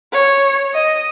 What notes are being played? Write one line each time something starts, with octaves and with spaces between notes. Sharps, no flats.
C#5
D#5